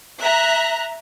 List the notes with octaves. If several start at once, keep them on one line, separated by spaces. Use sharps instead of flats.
E5 A#5 F#6